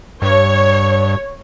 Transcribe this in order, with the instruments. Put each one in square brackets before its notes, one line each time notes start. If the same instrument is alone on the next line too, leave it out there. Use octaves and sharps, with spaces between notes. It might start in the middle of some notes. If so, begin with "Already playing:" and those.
[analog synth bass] G2 [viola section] C#5